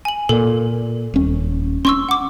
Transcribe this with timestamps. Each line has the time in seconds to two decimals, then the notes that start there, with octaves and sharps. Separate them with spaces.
0.05 G#5 F#7
0.29 A#2 A4
1.14 D#1 C#4
1.85 C#4 C6 C#6 E6
2.09 F#5 D6